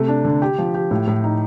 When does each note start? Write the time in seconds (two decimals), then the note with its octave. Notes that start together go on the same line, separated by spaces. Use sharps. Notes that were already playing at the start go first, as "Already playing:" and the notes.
Already playing: C3 A3
0.08 D4
0.25 D3
0.42 G4
0.58 F3
0.75 G4
0.91 A2
1.07 A2
1.24 D#4